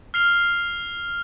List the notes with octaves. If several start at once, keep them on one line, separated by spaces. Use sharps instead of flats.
F6 C7 F7 G7